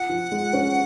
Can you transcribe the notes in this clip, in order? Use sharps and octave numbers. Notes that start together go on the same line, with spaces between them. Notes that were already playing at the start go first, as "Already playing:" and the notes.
Already playing: F4 F#5
F3
G#3
C#4